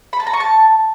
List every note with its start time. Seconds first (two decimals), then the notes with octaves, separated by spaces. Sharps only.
0.13 B5
0.20 A5
0.27 A#5
0.33 C#6
0.40 A5